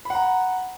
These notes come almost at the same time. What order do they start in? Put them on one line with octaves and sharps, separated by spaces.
B5 F#5 A#5